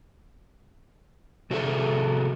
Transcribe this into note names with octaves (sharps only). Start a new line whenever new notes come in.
C3 F#4 G#4 A4 C#5 E5